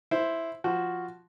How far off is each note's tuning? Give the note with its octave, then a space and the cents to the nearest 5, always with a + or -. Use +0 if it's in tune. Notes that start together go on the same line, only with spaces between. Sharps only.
E4 +0 C5 +0
F3 +0 F#4 +0